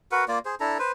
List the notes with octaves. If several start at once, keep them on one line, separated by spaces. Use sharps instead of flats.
F#4 A#4 B4 F#5
A#3 F4 D5
G#4 C5
D4 E4 A4 A#5
B4 C5